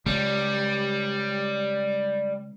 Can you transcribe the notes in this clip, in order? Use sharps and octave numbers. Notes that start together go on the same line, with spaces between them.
C#3 G3 G#3